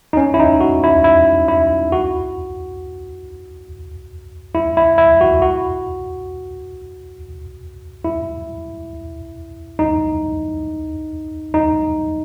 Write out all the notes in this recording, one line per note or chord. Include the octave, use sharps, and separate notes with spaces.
D#4
C#4
E4
D#4
F#4
E4
E4
E4
F#4
E4
E4
E4
F#4
F#4
E4
D#4
D#4